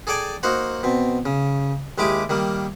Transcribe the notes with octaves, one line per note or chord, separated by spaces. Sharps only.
G#4 A4 D5 G5 G#5
A#3 D#4 F#4 C5 F#5
B2 C4
C#3
D#2 G#3 E4 G4 D6 D#6
D#3 G3 A#3